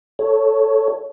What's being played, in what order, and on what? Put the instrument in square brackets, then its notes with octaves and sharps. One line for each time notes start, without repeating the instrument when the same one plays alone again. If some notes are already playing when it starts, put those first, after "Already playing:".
[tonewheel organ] A4 C#5